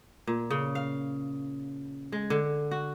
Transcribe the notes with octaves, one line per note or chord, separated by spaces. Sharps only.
A#2
C#3
F5
G#3
D3
F#4